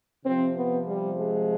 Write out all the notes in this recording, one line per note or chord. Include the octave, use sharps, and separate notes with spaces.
C3 F3 C4
B3
G3
G#3